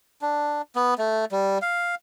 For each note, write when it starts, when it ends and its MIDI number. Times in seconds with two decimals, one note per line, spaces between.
0.22 0.62 62
0.76 0.94 59
0.98 1.25 57
1.32 1.58 55
1.62 1.95 77